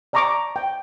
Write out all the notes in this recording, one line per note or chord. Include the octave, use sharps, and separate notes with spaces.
D5 A5 A#5 C#6 D6
G5